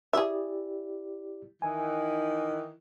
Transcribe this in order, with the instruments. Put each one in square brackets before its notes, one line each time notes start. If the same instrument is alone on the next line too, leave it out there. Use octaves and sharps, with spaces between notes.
[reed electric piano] E4 G4 D5 [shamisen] G#4 E5
[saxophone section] D#3 E3 [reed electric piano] G#5